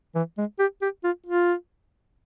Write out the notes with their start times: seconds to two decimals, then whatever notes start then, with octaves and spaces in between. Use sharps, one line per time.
0.15 E3
0.38 G#3
0.59 G4
0.81 G4
1.04 F4
1.26 F4